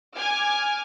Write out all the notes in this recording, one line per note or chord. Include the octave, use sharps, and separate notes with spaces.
G#5 D6 F6